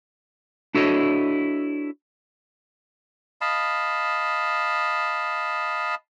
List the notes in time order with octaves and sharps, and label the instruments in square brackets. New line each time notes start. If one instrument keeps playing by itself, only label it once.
[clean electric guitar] D4 E4 F#4 A4 C#5 D#5
[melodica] D#5 F5 A5 B5